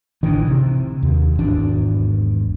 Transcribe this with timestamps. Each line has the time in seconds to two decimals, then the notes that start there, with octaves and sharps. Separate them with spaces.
0.23 A1 D#3 E3 D4
0.48 C3
1.02 D#2
1.39 G#1 E2 D4